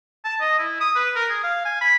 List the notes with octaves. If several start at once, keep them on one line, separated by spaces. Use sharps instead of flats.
A5
D#5
E4
D#6
B4
A#4
G#4
F5
G#5
B5